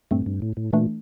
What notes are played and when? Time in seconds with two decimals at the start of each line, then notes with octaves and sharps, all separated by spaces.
0.11 G2 A#2 A3 C4
0.26 G2
0.42 A2
0.57 A2
0.73 A#2 E3 A3 D4